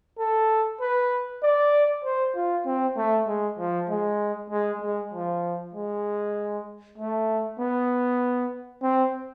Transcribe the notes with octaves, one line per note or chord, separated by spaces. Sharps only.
A4
B4
D5
C5
F4
C4
A3
G#3
F3
G#3
G#3
G#3
F3
G#3
A3
B3
C4